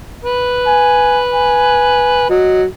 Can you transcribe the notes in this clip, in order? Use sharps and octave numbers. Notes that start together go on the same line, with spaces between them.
B4
G#5
G#5
F#3 D#5